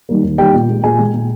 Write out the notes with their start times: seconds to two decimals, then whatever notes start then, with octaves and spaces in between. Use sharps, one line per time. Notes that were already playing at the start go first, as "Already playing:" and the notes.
0.09 D#3 G3 A#3
0.24 D#2
0.38 D#3 G3 A#3 G4 G5
0.54 A#2
0.69 G#3
0.83 A#2 G#4 G#5
0.98 G#3
1.13 A#2